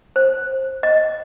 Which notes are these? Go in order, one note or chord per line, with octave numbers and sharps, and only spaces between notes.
C5
D#5